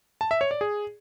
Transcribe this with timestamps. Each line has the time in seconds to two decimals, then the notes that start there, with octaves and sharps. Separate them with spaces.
0.21 A5
0.31 E5
0.41 C#5
0.51 D5
0.61 G#4